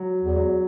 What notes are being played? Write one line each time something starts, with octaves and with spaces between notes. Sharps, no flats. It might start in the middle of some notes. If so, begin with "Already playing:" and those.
Already playing: F#3
E2
F#3